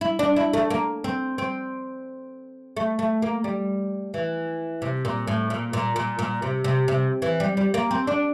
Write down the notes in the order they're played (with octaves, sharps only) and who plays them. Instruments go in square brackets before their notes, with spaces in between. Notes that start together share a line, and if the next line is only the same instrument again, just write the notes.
[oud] E4
D4
E4
A3
A#3
C4
C4
A3
A3
A#3
G3
E3
C3
A#2
A2
A#2
A#2
A#2
A#2
C3
C3
C3
E3
G3
G3
A#3
C4
D4